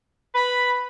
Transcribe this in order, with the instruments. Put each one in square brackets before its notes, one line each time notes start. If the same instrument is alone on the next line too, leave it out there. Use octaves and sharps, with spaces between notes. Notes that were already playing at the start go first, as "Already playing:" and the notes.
[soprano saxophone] B4 [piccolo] B5